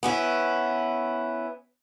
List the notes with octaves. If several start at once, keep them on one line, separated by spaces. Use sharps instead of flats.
B3 C#4 E4